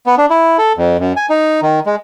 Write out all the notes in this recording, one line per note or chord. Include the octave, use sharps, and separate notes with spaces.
B3
D4
E4
A4
F2
F#2
G#5
D#4
D#3
G#3